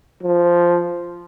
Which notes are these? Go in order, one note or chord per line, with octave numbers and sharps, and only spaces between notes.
F3